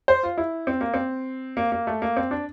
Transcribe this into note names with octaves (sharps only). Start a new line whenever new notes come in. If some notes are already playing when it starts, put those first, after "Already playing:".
C5
F4
E4
C4
A#3
C4
A#3
A#3
A3
A#3
C4
D4